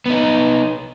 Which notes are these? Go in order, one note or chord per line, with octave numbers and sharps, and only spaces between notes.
B3 D#4